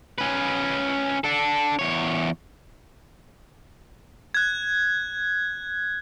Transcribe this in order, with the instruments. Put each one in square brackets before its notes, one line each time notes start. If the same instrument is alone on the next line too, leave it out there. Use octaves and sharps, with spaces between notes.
[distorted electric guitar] C#4 B4
D4 A4
E2 C#5
[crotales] F#6 G#6